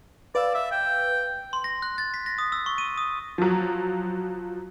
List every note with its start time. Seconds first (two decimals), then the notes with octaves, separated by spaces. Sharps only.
0.35 B4 D5 F5 E6
0.54 E5
0.71 G5
1.53 C6
1.64 A#6
1.82 F#6
1.98 A6
2.14 B6
2.26 A#6
2.38 D#6
2.52 E6
2.66 C#6
2.78 D#7
2.98 D#6
3.38 F3 F#3